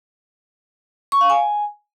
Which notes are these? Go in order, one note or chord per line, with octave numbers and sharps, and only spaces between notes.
C#6
F5
G#5